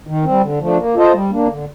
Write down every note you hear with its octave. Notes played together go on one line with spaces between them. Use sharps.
D#3
G3 C4
D3
F3 A3 D4
A#3
F4 A4 C5 D#5
G3
A#3 D4
D3